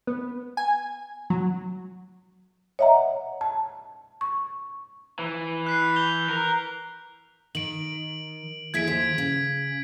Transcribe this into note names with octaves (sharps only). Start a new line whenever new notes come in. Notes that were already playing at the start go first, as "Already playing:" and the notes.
B3
G#5
F#3
C#5 D#5 E5 F#5 A#5
A5
C#6
E3
F#6 B6 C7
G6 F7 G7
A#4
D#3 D7 F#7
D#2 E4 G#4 G#6 B6 D7
D#2 C5
C#3